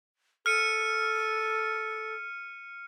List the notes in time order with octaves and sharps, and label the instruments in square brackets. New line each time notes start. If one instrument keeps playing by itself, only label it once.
[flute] A4 [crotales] F6 C#7 D#7